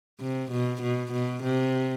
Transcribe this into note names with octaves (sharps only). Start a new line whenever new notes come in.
C3
B2
B2
B2
C3